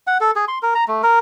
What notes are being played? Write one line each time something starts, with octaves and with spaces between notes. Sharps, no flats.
F#5
A4
G#4
C6
A#4
A#5
A3
A#4